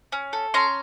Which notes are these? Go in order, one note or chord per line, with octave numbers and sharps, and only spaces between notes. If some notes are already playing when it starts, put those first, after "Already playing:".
C#4
A4
C#4 A#5 C6